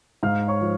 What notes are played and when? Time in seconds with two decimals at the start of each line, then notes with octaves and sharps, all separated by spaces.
0.23 G#2 F5 F6
0.48 C#5 C#6
0.61 F3